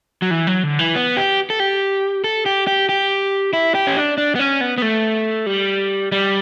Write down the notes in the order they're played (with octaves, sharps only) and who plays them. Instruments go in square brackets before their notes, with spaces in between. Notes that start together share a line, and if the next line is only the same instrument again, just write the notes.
[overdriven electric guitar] F#3
E3
F#3
D3
E3
B3
G4
A4
G4
A4
G4
G4
G4
E4
G4
C#4
D4
D4
B3
C#4
B3
B3
A3
G3
G3